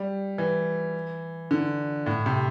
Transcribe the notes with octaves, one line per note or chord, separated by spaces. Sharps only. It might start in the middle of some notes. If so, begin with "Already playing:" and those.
Already playing: G3
E3
D3
A2
C3